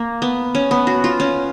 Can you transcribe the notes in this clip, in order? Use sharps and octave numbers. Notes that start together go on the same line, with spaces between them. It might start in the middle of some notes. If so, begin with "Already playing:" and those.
Already playing: A#3
B3
C#4
B3
F#4
F4
C#4